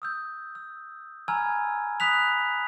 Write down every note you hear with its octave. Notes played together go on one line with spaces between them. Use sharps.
D#6 E6 G6
E6
G#5 A#5 B5 E6 F6 G#6
B5 D#6 F#6 B6 F7